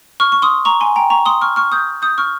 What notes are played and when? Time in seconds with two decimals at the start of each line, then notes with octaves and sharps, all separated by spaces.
0.20 C#6 F6
0.32 C#6
0.42 C6 D#6
0.65 A#5 C#6
0.80 G#5 C6
0.96 G5 A#5
1.10 A#5 C#6
1.26 C6 D#6
1.41 C#6 F6
1.56 C#6 F6
1.72 D#6 G6
2.02 D#6 G6
2.18 C#6 F6